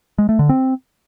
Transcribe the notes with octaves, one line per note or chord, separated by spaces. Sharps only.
G#3
A3
D3
C4